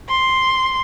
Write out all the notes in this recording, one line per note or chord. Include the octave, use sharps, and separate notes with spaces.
C6